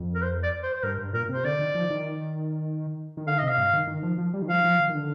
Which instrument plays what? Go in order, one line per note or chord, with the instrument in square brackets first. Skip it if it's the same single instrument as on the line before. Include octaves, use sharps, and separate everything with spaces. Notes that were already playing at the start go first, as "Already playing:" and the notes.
Already playing: [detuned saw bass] F2
[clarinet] A#4
C5
D5
C5
C5
[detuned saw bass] G2 [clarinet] A#4
[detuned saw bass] G2
[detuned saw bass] A#2 [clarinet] A#4
[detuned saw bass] C3 [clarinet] C5
[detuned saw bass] D3 [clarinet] D5
[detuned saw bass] D#3
F3
D#3
D#3
[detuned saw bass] D3 [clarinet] F5
[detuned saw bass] C3 [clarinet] D#5
[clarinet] F5
[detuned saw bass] G2
D#3
D#3
F3
F3
G3
D#3
[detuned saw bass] F3 [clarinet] F5
[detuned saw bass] F3
D#3
D#3
D3